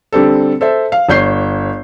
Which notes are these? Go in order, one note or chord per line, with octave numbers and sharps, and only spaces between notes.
D3 G3 C4 A4
A4 C5 E5
F5
G1 C#5 G6 C7